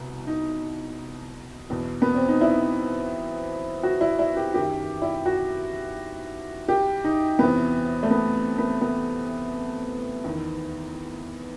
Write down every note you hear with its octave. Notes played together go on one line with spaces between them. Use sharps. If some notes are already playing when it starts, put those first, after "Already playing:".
Already playing: C2 B2
D#4
E2 B2
B3
C4
D#4
E4
F#4
E4
E4
G4
F#2 D#3 G4
E4
F#4
G4
D#4
E2 C3 E3 B3
A3
B3
B3
B3
E2 D#3